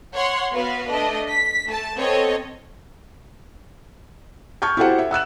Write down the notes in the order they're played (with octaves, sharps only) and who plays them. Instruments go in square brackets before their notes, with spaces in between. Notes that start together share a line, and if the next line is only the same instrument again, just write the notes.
[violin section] C#5 F#5 C6
B3 F#4 B4 F5
A3 D4 D#5
B6
A3 A5
B3 C4 A4 C#5 D#5 A5
[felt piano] A5 C#6 F6 G6 G#6
E4 F#4 G4 A4 C5 F#5
E5
F#5 E6 F#6 E7